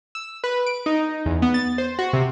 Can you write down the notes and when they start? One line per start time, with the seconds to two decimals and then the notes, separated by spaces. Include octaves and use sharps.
0.15 E6
0.44 B4
0.66 D7
0.86 D#4
1.25 E2
1.42 B3
1.54 A6
1.78 C5
1.99 F#4
2.13 C3